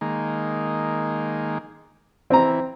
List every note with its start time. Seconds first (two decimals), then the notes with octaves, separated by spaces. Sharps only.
0.01 D#3 G#3 A#3
2.30 E3 C4 A#5